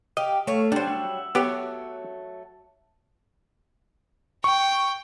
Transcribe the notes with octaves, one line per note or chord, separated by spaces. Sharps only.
G4 D#5 F5
A3 C#5 F5
F#3 G3 D4 C5
E5 F#5
F#3 A3 B3 G4
G5 C#6